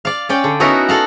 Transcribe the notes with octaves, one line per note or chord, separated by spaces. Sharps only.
D5 F5
C#4 D5 G5
D3
B3 C#4 D#4 E4 F#4 A#4
A4 F5 F#5